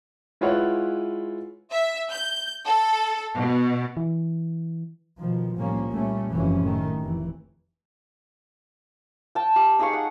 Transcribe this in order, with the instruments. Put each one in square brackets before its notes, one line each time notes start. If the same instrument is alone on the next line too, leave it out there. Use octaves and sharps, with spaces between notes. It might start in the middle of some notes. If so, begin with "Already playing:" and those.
[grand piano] G#3 E4 F4 B4 C#5 F#5
[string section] E5
G6
A4
B2
[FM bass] E3
[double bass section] B2 D#3 F3
C2 A2 F3 G3 A#3 C#4
A#2 G3 A3 C#4
F#1 G#2 C3 E3 F3 C#4
A2 D#3 A3
F1 E3
[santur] G5 A5
G4
D#4 G#4 F5 C#6
F#5